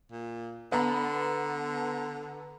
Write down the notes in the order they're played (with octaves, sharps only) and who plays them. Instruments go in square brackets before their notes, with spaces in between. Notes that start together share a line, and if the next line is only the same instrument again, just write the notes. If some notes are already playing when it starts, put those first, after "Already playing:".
[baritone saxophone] A#2
[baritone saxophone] D3 [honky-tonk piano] B3 A#5 B5